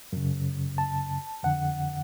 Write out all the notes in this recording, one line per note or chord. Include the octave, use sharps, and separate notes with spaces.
F#2 C#3
A5
F2 D3 F#5